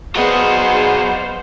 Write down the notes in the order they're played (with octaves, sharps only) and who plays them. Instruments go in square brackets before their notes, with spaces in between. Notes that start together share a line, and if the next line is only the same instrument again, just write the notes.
[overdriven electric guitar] F#3 D#5 [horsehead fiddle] B3 [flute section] F#4 G#4 D5 [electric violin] C5 F5